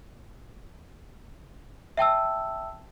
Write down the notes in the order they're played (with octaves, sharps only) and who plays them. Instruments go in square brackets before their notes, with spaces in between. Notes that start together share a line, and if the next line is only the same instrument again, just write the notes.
[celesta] E5 G5 A5 E6